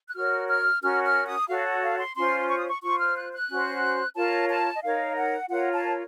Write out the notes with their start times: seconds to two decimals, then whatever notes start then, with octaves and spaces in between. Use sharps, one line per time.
0.07 F#6
0.15 F#4 A#4 C#5 F6
0.49 F6
0.82 C#4 F#4 A#4 C#5 F6
1.04 F6
1.27 D#6
1.48 F#4 A4 C#5 F5
1.83 F5
1.98 C6
2.15 C#4 F4 C5 C6
2.49 C#6
2.58 D#6
2.68 C#6
2.82 F4 C5 C#6
2.99 F6
3.16 F#6
3.32 F#6
3.50 C#4 F#4 C5
4.16 F4 A#4 C#5 A5
4.49 A5
4.74 D#5
4.83 D#4 A#4 C#5 F5
5.16 F#5
5.49 F4 A#4 C#5 F#5
5.72 A5